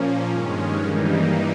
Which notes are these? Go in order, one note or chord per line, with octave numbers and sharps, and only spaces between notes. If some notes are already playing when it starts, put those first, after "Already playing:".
Already playing: A#2 F3 A#3 C#4
G2 D#3 G#3 C#4
G2 E3 G3 A#3 D#4